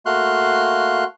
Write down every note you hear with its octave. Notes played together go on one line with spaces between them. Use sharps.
A3 A#3 F#4 F5 C6 F#6